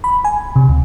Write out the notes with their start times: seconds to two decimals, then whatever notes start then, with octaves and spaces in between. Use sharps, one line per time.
0.04 B5
0.24 G#5
0.56 C3
0.69 D2